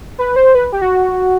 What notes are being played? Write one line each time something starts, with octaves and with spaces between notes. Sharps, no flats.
B4
C5
B4
G4
F#4